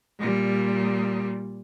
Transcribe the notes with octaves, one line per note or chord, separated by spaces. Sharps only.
A#2 G3